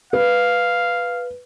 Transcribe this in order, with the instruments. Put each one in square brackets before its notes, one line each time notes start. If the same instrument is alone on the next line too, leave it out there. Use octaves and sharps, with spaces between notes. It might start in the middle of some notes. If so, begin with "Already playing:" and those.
[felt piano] B4 [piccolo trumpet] F5